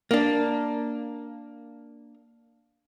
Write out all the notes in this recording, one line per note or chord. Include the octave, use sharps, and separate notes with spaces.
A#3 D4